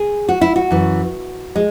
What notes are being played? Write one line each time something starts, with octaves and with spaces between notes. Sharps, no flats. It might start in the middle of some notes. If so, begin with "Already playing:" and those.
Already playing: G#4
F#4
E4
F#4
F#2 E3
G#3